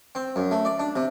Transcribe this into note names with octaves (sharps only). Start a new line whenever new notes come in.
C4
F#2
A3
D5
D4
C3